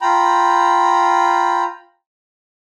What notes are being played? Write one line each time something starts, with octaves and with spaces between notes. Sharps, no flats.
F4 G5 A#5 B5